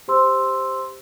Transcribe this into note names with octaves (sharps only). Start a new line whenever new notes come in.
G4 C5 C6 E6